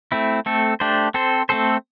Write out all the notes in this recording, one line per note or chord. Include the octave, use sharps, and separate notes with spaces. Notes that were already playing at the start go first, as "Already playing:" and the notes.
A3 C4 E4
A3 C4 A4
A3 D4 G4 C5
C4 A4 C5
A3 C4 A4 C5